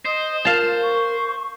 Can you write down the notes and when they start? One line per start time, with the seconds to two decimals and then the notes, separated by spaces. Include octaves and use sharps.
0.05 C5 D#5 D#6
0.45 F4 A#4 F5 A5
0.82 C#6